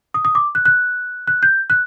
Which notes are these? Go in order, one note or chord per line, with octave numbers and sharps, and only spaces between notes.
D#6
D#6
D6
F#6
F#6
F#6
G6
F#6